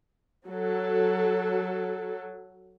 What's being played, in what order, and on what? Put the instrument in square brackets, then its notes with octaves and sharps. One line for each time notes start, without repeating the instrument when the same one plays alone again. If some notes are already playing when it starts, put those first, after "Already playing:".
[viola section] F#3 A4